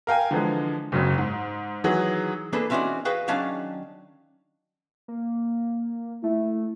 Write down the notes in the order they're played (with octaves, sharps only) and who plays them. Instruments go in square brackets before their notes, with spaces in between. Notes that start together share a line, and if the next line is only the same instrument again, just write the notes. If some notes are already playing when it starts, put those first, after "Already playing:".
[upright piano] A#4 F5 G5 G#5
D3 E3 F3 G#3
F#1 F#2 C#3
G#2
D#3 E3 F#3 F#4 G#4
[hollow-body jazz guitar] E3 A#3 D4 G#4 A4 B4
E3 C4 C#4 D#4 F#4 D5
F#4 G#4 B4 F5 G5
D#3 F#3 C#4 D4 F5 A5
[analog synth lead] A#3
[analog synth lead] A3 [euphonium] E4